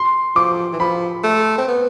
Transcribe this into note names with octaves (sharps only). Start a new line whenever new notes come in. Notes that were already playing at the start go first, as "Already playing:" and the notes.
Already playing: C6
F3 D6
E3
F3 B5
A3
C4
B3